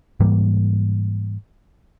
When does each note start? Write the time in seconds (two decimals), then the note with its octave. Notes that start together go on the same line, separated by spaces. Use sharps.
0.20 G#2 E3 G3 A#3